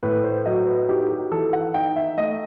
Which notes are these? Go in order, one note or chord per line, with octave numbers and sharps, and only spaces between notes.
A2 B4
C5
F#3 D#5
B4
D#4 G4
G4
E3 A4
F#5
D#4 G5
E5
A3 D#5